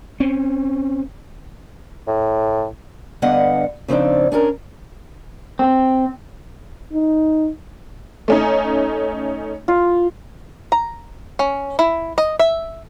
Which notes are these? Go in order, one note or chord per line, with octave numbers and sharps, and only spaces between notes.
C4 C#4
A2
G2 D3 B3 D#5 F5 F#5
C#3 F3 C4 D4 D#4
C#4 D4 A4 A#4
C4
D#4
A3 C#4 D#4
F4
A#5
C#4
E4
D#5
E5